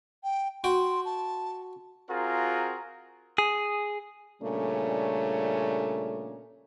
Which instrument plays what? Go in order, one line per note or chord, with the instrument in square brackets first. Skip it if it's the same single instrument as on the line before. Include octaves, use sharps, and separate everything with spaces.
[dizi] G5
[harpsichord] F#4 G5 [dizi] C6
[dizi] A5
[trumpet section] C4 F4 F#4 G#4 A#4 A#5
[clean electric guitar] G#4
[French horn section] A#2 C#3 G3 A3 C#4 D4